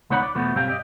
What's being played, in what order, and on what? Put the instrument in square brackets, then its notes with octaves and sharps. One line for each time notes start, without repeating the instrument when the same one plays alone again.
[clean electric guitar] C#2 B3 D#4 C#5 F#5 B5
D5
E2 B2 F3 A3 B3
B1 G2 C4 G4 F5 G#5
G4 D5 D#5